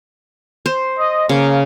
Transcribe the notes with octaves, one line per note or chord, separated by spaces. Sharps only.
C5
D#5
C#3 A#3